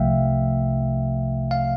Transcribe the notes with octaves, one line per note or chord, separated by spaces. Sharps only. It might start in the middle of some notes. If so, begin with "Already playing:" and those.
Already playing: C2 C3 F3 A3 E5 F5 G5
F5